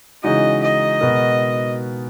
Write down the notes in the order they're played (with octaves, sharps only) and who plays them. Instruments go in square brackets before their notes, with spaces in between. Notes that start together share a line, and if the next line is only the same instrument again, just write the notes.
[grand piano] C#3 E3 G#3 D#4 F#4 [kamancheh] D#5
[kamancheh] D#5
[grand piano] B2 G#3 B3 F#4 A#4